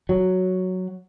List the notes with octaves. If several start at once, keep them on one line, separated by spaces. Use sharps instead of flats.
F#3